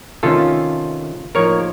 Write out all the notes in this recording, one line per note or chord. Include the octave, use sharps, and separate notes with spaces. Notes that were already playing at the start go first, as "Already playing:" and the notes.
C3 D#3 A3 C#4 F4 A4
A2 F3 A#3 D#4 A#4 C#5